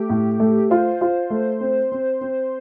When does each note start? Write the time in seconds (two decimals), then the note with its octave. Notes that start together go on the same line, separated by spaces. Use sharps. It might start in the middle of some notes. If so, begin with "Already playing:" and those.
Already playing: A3 G4
0.10 A2
0.40 A3
0.70 F4 C5
1.01 F4
1.30 A3
1.61 C4
1.92 C4
2.21 C4